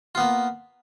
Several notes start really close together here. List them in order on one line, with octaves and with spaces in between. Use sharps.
F4 B3 A#3